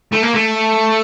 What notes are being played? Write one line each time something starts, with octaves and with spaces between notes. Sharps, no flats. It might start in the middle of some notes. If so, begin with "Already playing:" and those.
A3
A#3
A3